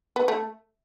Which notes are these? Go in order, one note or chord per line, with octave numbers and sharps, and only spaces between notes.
B3
A3